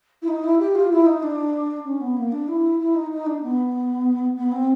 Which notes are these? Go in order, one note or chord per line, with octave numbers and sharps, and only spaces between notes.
E4
D#4
E4
G4
F4
E4
D#4
D4
C#4
B3
A#3
D4
E4
E4
D#4
D#4
D4
B3
B3
C4